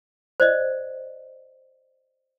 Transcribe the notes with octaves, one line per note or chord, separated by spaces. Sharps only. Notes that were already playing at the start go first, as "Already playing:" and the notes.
C5 D5 D#5